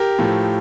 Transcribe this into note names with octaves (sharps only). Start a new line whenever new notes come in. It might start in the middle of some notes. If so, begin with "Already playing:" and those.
Already playing: G4 A#4
A2 F3 A3